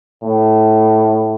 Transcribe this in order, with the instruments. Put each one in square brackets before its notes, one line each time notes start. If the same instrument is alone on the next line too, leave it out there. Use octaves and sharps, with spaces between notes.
[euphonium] A2